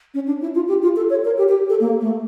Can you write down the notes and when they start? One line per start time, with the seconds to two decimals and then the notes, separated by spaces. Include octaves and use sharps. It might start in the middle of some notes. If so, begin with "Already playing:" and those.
0.14 C#4
0.27 D4
0.42 E4
0.55 F4
0.68 G4
0.83 F4
0.96 A4
1.10 C#5
1.25 A#4
1.38 G4
1.49 G4
1.69 A4
1.80 A#3
2.01 A3